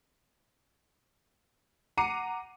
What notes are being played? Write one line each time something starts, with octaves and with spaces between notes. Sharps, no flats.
F#5 A#5 D6 C7 C#7 D#7